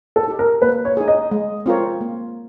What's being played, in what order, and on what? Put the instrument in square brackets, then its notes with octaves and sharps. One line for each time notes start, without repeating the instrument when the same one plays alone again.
[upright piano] A4
[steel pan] D#4 G4
[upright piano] A#4
[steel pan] A#3 [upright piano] B4
[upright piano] C#5
[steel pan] D#4 G#4
[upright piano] D#5
[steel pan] G#3
C4 F4 A#4 C#5
A#3